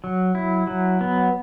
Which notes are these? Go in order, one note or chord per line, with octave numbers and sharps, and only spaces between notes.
F#3
E4
F#3
B3